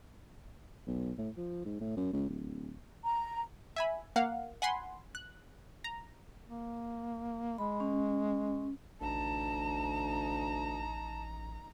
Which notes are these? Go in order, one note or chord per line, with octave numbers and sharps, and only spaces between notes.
B1
A2
F3
G#2
A2
F#2
C#2
D1
A#5
E5 G#5 B5
A#3 F5 F#5
F#5 G#5 B5 C6
F#6
A#5
A#3
G#3 B5
C#4
A1 D2 D#4 A5 A#5